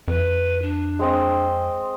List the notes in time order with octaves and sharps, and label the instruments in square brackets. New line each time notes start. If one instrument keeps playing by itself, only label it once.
[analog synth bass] F2 [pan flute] B4
[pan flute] D4
[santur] G#3 C4 D#5